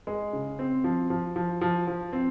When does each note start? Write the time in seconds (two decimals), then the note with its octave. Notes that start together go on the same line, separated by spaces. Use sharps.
0.07 G#3
0.33 C#3
0.59 C4
0.84 F3
1.10 F3
1.36 F3
1.61 F3
1.87 F3
2.13 C4